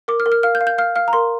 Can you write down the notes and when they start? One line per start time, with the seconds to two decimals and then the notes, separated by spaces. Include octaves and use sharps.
0.08 A#4 D6
0.20 F6
0.26 A#4
0.32 F6
0.43 F5 F6
0.55 G6
0.61 F5
0.67 G6
0.78 F5 F6
0.96 F5 F6
1.08 A#5
1.13 A#4 C6